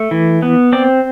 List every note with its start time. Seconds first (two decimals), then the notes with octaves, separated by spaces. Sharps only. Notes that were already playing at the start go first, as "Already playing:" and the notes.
Already playing: A3
0.11 E3
0.42 B3
0.73 C4 D5